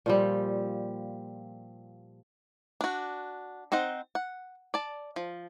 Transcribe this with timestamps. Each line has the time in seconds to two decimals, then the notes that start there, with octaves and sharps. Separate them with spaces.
0.06 A#2 F3 G3
2.81 D4 F#4
3.72 C4 D#4 C5 F#5
4.15 F#5
4.74 D5 A5
5.16 F3